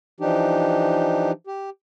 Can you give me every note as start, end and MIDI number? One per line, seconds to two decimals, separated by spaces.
0.20 1.32 52
0.20 1.32 53
0.20 1.32 62
0.20 1.32 63
0.20 1.32 67
1.47 1.70 67